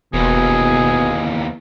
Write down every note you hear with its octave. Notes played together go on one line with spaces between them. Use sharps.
E1 D#2 B2 E3 G#4